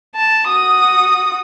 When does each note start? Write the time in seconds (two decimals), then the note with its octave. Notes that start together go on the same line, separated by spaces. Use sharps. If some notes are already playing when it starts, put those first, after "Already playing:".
0.15 A5
0.48 F#4 D#6